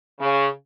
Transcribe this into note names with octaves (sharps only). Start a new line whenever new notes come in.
C#3